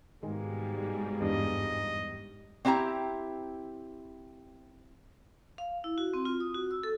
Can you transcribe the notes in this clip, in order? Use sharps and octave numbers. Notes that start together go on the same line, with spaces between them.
G#2 B2 D#3 G3 G#3 A#3 G#4
E2 G2 D4 D#5
C4 D4 E4 G4 A#5
F5
E4
F#4
C4
F4
D#6
F#4
E6
A4